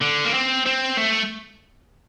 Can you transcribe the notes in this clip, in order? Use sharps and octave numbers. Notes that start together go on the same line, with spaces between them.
D3
A#3
C4
C4
A3